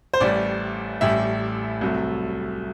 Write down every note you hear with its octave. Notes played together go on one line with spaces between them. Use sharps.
C5
A1 A2 G3 D5
A1 A2 G3 E5
C2 C3 F#3 A3